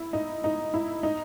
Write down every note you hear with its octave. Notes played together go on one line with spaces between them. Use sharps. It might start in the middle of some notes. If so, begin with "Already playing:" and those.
Already playing: E4
D#4
D#4
E4
D#4